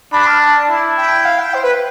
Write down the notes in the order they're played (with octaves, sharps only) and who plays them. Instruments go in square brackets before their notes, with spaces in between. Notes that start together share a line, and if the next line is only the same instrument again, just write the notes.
[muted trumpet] D4 [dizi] B5
[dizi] F6
A5
[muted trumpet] E4
[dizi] G5
F5
G5
C5
B4